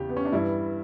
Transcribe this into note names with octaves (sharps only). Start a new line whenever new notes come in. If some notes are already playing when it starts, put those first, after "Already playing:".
Already playing: E2 C#3 E3 G4
B3
C#4
D4
G2 E3 G3 E4